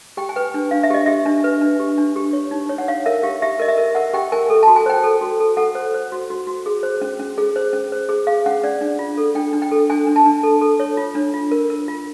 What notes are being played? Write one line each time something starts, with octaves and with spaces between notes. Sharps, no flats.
G4 G5
G#5
B4 G5
D4
D4 F5
E5
G4 D#5
G4 E5
D4
B4
D4
G4
D4
G4
C#5
D#4
C#5
F#5
C#5 F5
A#4 E5
G4 F5
G4 E5
A#4 D#5
E5
A#4
A#4 F#5
G4 G5
A#4 G#5
A4
F#4 A5
G#5
C5 G5
A4
F#4
A4
A4 F#5
C5
C5
F#4
F#4
F#4
G#4
C5
C#4
C#4
G#4
C5
C#4
C5
G#4
G#4 F5
C#4 F#5
C#4 D5
D4
F4
A4
D4 G5
D4
G5
A4
D4 G#5
D4
A5
D4
A4
A4
C#5
F4
D4
F4
A#4
A#4
F4